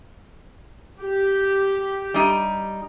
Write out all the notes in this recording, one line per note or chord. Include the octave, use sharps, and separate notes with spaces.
G4
G3 D#4